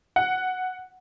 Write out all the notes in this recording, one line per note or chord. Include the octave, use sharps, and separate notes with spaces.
F#5